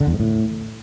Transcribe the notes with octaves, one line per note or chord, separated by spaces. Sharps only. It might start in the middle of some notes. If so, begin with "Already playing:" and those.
D3
E2
G#2
A2